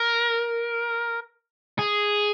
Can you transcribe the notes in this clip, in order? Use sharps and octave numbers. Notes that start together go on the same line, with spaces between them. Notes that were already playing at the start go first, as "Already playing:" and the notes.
Already playing: A#4
G#4